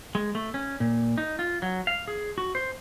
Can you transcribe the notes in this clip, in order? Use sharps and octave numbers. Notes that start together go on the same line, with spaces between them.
G#3
A3
C#4
A#2
D#4
F4
F#3
F5
G#4
F#4
C5